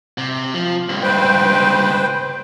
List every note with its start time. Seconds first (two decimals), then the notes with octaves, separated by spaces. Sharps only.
0.18 C3
0.54 F3
0.89 C#2 G2
1.03 B4 C5 G5